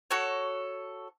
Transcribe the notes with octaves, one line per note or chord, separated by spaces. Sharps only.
F#4 A4 C#5